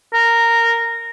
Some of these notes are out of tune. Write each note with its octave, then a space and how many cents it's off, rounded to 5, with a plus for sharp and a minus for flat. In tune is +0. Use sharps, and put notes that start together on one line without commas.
A#4 -10